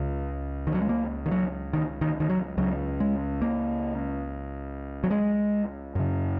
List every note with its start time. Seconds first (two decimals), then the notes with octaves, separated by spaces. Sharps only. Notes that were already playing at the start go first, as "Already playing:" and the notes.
Already playing: C#2 C#3
0.67 D#3
0.74 F#3
0.82 G#3
0.89 A#3
1.26 D#3
1.31 F#3
1.73 D#3
2.01 D#3
2.20 D#3
2.30 F#3
2.57 C#2 C#3 F#3
3.00 G#3
3.42 A#3
5.04 F#3
5.11 G#3
5.95 F#2 C#3